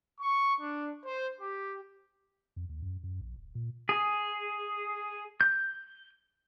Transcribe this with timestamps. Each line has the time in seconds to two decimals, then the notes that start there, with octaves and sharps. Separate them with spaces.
0.21 C#6
0.61 D4
1.05 C5
1.41 G4
2.56 F2
2.69 D#2
2.82 F#2
3.03 F#2
3.21 A#1
3.36 D1
3.55 A#2
3.89 G#4
5.41 G6